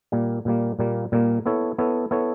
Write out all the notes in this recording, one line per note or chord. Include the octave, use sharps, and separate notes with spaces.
A#2 G3 A#3
A#2 G3 A#3
A#2 G3 A#3
A#2 G3 A#3
B3 E4 A4 C#5
B3 E4 A4 C#5
B3 E4 A4 C#5